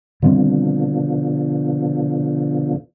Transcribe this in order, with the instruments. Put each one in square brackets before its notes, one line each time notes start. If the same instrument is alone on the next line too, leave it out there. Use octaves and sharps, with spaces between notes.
[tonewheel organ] B2 D3 F3 [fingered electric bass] D#3 G3 C4